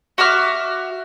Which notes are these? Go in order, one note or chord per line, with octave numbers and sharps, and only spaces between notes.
F#4 E5 D6 F6